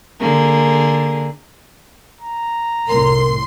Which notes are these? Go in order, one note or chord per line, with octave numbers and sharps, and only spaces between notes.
D3 A#3 G#4
A#5
F1 C2 A2 A#4 C6